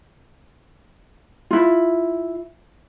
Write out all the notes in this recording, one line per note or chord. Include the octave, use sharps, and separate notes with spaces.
E4 F4